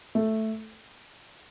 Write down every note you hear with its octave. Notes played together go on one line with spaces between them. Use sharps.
A3